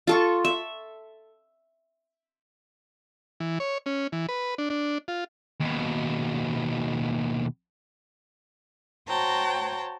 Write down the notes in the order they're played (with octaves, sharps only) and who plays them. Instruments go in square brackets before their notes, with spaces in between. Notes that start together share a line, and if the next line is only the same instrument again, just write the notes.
[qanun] F4 A4 C#6
E5
[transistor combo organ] E3
C#5
C#4
E3
B4
D4
D4
F4
[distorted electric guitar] D#2 B2
[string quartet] F#4 C5 C#5 G5 A5 A#5